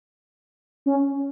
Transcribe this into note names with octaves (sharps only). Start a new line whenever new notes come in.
C#4